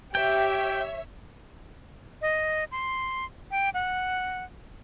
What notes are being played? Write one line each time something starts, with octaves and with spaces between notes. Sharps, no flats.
G4 C#5 E5 G5
D#5
C6
G5
F#5